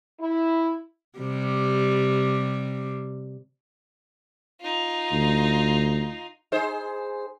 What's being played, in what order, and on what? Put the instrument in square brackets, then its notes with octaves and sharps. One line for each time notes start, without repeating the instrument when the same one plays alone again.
[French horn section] E4
[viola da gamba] C3 G3
[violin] D#4 F4
[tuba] D2
[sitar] D#4 G#4 C5